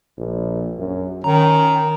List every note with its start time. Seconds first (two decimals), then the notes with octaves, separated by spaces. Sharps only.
0.18 A#1
0.78 F#2
1.24 D#3 C#4 A#5